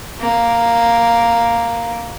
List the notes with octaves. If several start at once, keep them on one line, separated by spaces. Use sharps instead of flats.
A#3